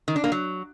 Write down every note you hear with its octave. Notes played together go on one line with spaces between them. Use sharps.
D#3
D4
A#3
F#3